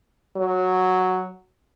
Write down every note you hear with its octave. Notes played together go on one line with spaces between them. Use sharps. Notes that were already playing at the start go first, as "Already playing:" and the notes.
F#3